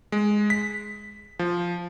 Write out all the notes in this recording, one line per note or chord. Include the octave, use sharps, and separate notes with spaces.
G#3
B6
F3